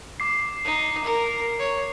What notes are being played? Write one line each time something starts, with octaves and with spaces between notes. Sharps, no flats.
D6 C7
D#4
A#4
C#5